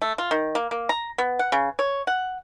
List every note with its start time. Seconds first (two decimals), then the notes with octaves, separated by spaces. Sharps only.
0.02 A3
0.18 F4
0.31 D#3
0.55 A#3
0.71 A#3
0.89 A#5
1.18 B3
1.39 F#5
1.52 C#3
1.79 C#5
2.07 F#5